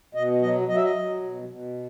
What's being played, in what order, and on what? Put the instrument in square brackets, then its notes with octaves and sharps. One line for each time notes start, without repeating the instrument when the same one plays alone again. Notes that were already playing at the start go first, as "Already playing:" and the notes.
[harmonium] B2 D#5
F#3 D#5
F#3 D#5
E5
D#5
F#3
B2
B2